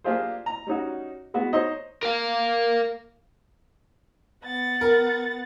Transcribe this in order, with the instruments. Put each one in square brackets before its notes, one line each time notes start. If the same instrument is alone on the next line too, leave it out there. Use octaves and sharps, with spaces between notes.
[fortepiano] A#3 D4 F4 G4 G#4 C5
A#5
G3 C#4 D#4 F#4
G#3 B3 F#4
D#4 C5 C#5 D#5
[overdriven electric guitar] A#4 F5
[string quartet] B3 F#5 A6
[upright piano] A#4